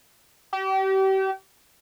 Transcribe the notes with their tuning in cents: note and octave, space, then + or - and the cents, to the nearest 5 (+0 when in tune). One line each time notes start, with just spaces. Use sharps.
G4 -35